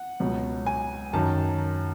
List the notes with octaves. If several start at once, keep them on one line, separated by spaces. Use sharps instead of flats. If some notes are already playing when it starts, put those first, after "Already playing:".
Already playing: F#5
C#2 B2 F#3
G#5
F#2 D#3 F#3 A5